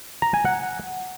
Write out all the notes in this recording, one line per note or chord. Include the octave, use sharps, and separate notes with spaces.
A#5
G#5
F#5